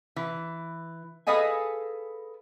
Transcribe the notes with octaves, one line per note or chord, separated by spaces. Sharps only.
E3
G#4 A4 B4 D#5 F5 G#5